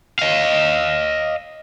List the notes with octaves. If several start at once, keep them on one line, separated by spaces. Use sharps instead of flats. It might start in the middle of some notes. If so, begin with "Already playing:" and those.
D#5 F5